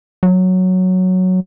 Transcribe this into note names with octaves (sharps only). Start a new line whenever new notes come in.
F#3